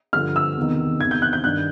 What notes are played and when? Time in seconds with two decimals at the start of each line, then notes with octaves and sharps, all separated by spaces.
0.13 G2 D3 F3 F6
0.36 E6
0.57 E2 C3 D#3
1.00 E2 C3 D#3 G#6
1.11 G6
1.22 F#6
1.33 G6
1.44 G2 D#3 F#6